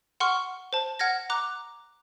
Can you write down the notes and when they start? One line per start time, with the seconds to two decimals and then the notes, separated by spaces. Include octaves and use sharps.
0.20 F#5 C6 C#6 F6
0.73 C5 A5
0.99 F#5 F6 G#6 A#6
1.30 A#5 D6 F#6